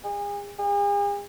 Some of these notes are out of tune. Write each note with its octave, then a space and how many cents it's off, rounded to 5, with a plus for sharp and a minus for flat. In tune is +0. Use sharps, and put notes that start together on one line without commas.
G#4 -35
G#4 -45